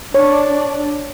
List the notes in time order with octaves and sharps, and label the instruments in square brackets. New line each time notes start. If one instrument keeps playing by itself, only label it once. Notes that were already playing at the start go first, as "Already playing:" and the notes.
[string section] D4 D5 [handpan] C#5